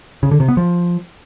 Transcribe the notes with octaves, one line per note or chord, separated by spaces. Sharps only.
C#3
D3
C3
B3
F3